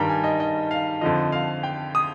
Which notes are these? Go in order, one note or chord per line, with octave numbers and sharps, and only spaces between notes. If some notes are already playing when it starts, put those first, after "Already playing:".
Already playing: G2 D#3 G3 G5 A#5
G#5
D#5
D#5
F5
F2 D3 F3 D#5
F5
G5
D#6